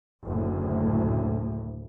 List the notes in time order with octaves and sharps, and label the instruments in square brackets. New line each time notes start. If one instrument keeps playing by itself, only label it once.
[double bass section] F#1 D2 A2